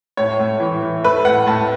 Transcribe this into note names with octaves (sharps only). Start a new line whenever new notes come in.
A2 C#5
A2
E3
E3
A3 B4
A2 F#5
A2 A5